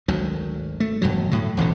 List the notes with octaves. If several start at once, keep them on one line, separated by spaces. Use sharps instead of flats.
G#1 D2 F#3
A3
E1 G2 B2 F#3
A2 D3 F#3
E1 A1 D2 D3